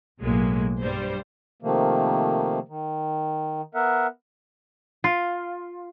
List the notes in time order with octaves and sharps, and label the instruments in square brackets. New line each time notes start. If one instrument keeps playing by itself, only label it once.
[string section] B1 A2 F#3 G#3 A#3
G2 G3 C5
[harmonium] C3 D#3 F3 A3 A#3
D#3
B3 A#4 E5 F#5
[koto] F4